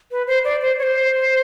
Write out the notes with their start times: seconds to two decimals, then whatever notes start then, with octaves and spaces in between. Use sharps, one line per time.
0.11 B4
0.27 C5
0.44 D5
0.61 C5
0.78 C#5
0.83 C5